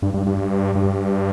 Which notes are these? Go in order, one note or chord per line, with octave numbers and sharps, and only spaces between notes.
G2
G2
G2
G2